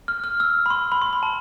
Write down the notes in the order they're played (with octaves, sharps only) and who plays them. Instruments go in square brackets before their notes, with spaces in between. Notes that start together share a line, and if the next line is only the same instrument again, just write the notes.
[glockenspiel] F6
F6
E6
B5
C6
B5
C6
B5
A5